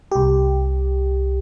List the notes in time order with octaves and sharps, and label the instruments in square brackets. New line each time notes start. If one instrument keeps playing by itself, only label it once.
[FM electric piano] C2 G4